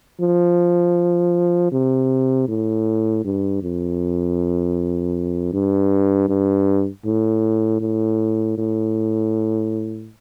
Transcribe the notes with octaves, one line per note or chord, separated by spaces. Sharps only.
F3
C3
A2
G2
F2
G2
G2
A2
A2
A2